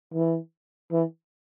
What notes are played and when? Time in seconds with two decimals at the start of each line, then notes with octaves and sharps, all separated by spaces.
0.14 E3
0.92 E3